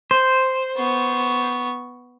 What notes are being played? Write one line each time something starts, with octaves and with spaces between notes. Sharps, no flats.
C5
B3 C#6